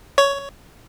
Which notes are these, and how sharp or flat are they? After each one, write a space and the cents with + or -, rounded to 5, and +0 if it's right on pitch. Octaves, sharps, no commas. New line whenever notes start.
C#5 +10